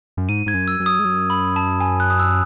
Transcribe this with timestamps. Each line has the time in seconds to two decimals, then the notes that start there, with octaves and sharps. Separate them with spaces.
0.17 F#2
0.29 G#2 D#7
0.46 G#2 G#6
0.54 F#2
0.68 E6
0.80 F#2
0.86 D#6
0.99 G#2
1.05 F#2
1.30 B5
1.56 A5
1.81 G#5
2.00 F#6
2.10 D#6
2.19 E6